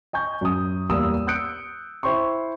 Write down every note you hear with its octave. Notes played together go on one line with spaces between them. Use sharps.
D#5 G#5 C#6 G6
F#2 D#6
E2 G3 A#3 D#6 E6
D#6 E6 F#6 G6 C#7 D7
E4 C5 G5 C6 C#6